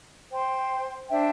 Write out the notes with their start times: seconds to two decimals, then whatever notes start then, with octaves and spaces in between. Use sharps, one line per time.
0.32 C5 G5 C6
1.08 D4 C5 E5 G5